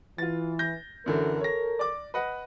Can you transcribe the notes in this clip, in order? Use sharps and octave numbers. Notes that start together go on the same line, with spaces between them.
E3 F4 A6
G6 A#6
F#2 D3 E3 A4 A#4
C#5 A#6
D5 D6
B4 D#5 F#5